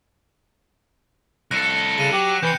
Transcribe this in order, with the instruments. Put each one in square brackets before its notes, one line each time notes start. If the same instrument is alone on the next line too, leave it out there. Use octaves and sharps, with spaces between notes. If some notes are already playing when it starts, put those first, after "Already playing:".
[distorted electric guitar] C2 A4 [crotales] F#6 A#6 C#7
[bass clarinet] C#3 [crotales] A#6 D#7 E7
[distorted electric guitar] F#3 F#4 [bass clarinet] G4
[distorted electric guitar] C3 G5 [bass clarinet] E3 [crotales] G6 C#7